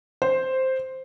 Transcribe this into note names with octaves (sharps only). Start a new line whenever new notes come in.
C5